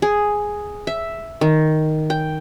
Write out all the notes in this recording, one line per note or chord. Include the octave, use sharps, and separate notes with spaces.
G#4
E5
D#3
G5